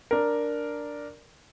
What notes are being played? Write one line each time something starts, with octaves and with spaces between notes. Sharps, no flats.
D4 A#4